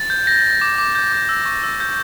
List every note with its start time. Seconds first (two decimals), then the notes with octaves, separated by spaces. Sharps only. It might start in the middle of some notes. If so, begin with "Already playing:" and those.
Already playing: A6
0.10 G6
0.27 G6 A#6
0.44 G6
0.61 D6
0.78 D6
0.95 G6
1.12 D6
1.29 E6
1.46 C#6
1.63 E6
1.80 G6